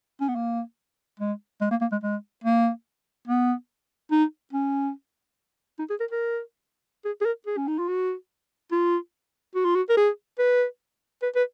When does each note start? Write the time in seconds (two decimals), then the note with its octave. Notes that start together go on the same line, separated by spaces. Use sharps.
0.21 C#4
0.29 B3
0.36 A#3
1.20 G#3
1.62 G#3
1.71 A#3
1.82 A#3
1.92 G#3
2.03 G#3
2.44 A#3
3.28 B3
4.11 D#4
4.53 C#4
5.79 D#4
5.90 G#4
6.00 A#4
6.11 A#4
7.05 G#4
7.21 G#4
7.25 A#4
7.47 G#4
7.57 C#4
7.68 D#4
7.79 F4
7.89 F#4
8.72 F4
9.55 F#4
9.65 F4
9.75 F#4
9.89 A#4
9.97 G#4
10.39 B4
11.23 B4
11.35 B4